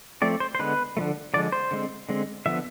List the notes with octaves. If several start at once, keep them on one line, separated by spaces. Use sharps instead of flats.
F3 A3 C4 D5
C5
C5
D3 G#3 B3 B4
D3 F3 A3
D3 F3 G#3 D5
C5
D3 G#3 C4
D3 G#3 C4
D3 F3 B3 E5